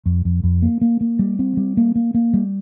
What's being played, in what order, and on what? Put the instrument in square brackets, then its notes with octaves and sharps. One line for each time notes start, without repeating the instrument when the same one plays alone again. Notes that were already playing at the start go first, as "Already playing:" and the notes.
[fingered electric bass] F2
F2
F2
A#3
A#3
A#3
G3
C4
G3
A#3
A#3
A#3
G3